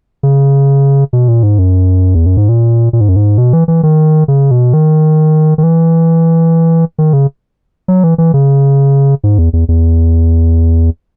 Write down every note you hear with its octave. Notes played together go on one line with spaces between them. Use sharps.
C#3
B2
A#2
G#2
F#2
E2
F#2
G#2
A#2
A#2
G#2
F#2
G#2
B2
E3
E3
D#3
C#3
B2
D#3
D#3
E3
D#3
C#3
F#3
E3
E3
C#3
G#2
E2
E2
E2